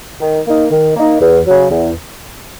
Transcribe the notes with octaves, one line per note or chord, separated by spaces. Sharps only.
D#3
A#3 D#4
D#3
A#3 D#4
E2
C#3 F#3
E2